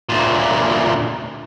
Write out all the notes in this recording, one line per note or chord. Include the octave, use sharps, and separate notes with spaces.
D2 A#2